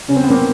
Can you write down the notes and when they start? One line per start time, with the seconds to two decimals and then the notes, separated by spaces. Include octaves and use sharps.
0.08 C#3 C#4
0.16 C4
0.23 B3
0.30 A#3 C4